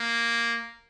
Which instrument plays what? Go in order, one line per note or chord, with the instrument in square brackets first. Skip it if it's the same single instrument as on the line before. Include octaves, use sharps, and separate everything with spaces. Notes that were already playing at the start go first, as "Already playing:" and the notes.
Already playing: [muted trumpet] A#3